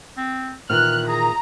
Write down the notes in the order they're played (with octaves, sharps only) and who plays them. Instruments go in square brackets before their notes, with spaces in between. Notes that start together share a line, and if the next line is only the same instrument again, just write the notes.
[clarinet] C4
[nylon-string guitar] A#2 D#3 E3 [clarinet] F6 [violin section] F#6
[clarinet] G#4 [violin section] A#5